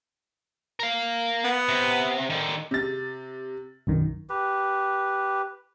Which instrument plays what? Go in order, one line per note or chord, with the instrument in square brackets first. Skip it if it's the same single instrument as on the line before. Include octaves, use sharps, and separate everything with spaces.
[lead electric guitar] A#4 F5
[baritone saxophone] B3
[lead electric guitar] C3
D3 D#3
[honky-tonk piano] C3 A6
[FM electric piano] B1 F#2 D#3
[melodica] G4 B4